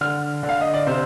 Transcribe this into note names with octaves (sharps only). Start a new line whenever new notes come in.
D3 F6
D3
F5
D#5
D5
C3 C5